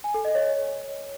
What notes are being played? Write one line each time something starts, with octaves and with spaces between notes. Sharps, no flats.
G#5
A4
D#5
C#5